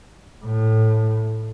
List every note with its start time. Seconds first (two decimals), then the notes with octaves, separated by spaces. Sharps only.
0.45 A2